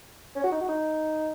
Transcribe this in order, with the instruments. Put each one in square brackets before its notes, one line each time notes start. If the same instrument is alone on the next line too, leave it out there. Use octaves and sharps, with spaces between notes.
[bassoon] C#4
F#4
D#4
F#4
D#4